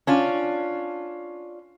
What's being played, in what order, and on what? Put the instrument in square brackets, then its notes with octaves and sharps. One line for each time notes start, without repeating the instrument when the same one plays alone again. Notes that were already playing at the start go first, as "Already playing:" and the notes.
[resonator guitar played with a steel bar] C#4 D4 F4